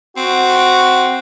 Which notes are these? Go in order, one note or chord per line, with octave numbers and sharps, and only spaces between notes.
C4 F#4